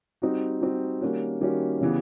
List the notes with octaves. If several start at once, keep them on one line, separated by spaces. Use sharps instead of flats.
G3 C4 D#4 F#4
G3 C4 D#4 F#4
D#3 G3 A#3 C#4 F#4
D#3 G3 A#3 C#4 F#4
C#3 E3 G3 B3